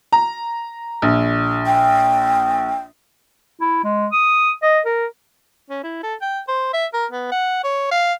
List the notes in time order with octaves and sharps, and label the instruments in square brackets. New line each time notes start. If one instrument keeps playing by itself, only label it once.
[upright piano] A#5
A#1
[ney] G5
[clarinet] E4
G#3
D#6
D#5
A#4
[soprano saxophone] C#4
E4
A4
G5
C5
E5
A#4
B3
F#5
C#5
F5